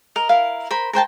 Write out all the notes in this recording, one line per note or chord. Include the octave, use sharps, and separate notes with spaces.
A#4 D#5
E4 A#4 F5
A#4 C5 B5
A#4 C5 G5 A5